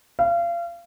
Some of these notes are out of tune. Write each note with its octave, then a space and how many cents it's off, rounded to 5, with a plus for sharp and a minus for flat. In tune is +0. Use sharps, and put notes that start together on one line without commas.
F5 -30